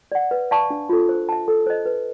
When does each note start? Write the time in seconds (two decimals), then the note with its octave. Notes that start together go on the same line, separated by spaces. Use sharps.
0.12 D5 F#5
0.31 B4
0.51 D5 F5 A5 C#6
0.70 D4
0.89 F4 A4
1.09 C5
1.29 E5 A5
1.48 A4
1.66 C5 D#5
1.86 B4